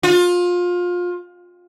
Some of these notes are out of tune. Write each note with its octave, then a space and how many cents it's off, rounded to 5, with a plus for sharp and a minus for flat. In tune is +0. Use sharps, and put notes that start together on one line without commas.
F4 +25